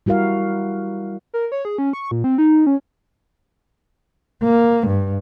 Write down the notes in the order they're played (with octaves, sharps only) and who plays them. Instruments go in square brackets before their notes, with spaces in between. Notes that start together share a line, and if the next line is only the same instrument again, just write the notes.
[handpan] G3 E4 F#4 A#4 F5
[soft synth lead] A#4
C#5
G#4
C#4
C#6
A#2
C4
D#4
C#4
[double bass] A#3
G2